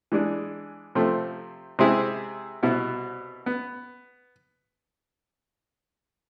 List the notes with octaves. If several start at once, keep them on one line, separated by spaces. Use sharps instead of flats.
E3 G#3 D4 G#4
C3 F3 A3 C4
C3 G#3 C4 E4 G#4
C2 B2 B3 E4
B3